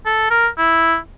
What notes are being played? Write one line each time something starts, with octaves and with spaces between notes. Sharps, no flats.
A4
A#4
E4